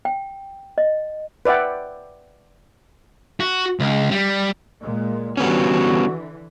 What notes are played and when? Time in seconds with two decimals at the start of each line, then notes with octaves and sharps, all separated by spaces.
0.05 G5
0.78 D#5
1.45 B4 D5 E5 F#5 G5
3.40 F#4
3.80 C#2
4.11 G3
4.81 A#2 G#3
5.37 D3 E3 G3 B3 C#4 F#4